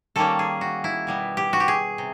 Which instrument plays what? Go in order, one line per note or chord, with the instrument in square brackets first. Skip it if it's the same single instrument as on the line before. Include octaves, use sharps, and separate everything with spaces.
[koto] D#3 G3 A#3 C#4 A4
G#4
F#4
E4
B2 G3 B3
G4
F#4
G4
G#4
C3